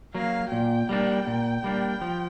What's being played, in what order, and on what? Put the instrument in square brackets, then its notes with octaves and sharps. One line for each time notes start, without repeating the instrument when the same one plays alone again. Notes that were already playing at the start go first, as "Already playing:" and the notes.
[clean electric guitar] F#3 A#3 [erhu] F5
[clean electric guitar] A#2 [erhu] G5
[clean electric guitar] G3 A#3 D4
A#2
G3 A#3 D4
F3